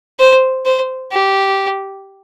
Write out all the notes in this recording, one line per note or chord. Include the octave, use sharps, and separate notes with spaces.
C5
C5
G4